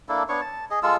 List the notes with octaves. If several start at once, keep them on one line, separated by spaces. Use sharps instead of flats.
A#3 D4 E4 A4
B3 D4 C#5 C#6
A5
G#4 D#5
G#3 F4 A4 E6